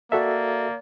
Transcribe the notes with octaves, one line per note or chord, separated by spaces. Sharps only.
A#3 F#4 A4 D5 E5